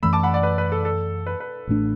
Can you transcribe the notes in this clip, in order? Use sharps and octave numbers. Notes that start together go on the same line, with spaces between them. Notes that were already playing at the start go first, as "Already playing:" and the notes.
F#2 E3 A3 B5 E6
A5 D6
F#5 B5
D5 F#5
B4
B4
A4
A4
B4
B4
A1 A2 A3 D4